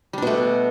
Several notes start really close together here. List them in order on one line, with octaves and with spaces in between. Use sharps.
G3 D4 B2 A3